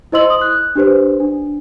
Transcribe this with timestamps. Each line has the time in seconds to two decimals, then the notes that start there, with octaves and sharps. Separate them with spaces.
0.12 E4 C5 D#5 C6 E6 F#7
0.30 D#6
0.41 F#6
0.76 D4 G4 B4 C5
1.20 D4